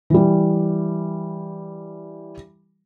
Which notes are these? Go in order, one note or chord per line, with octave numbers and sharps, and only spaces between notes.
E3 G3